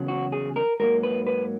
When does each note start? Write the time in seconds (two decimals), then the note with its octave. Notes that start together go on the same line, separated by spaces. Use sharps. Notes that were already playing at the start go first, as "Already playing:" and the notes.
Already playing: E2 C#3 F#3
0.08 F#4
0.32 G#4
0.56 A#4
0.80 G#2 F#3 A#3 A#4
1.03 B4
1.27 B4